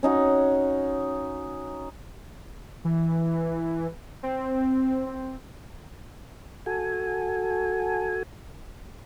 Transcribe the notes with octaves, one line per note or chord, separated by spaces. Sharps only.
C#4 D#4 F#4
E3
C4
C4
F#4 A4 G#5